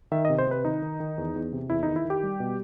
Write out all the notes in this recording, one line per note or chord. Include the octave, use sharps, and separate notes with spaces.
D#3 E5
D#5
C3
C5
C3 B4
D#3 D#4
D#3
D#3
E2
E2
C3
E2 E4
D#4
D#3
E4
D#3
G4
G3
B2